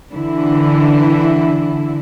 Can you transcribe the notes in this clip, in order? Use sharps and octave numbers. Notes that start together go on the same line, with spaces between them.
D3 E3 E4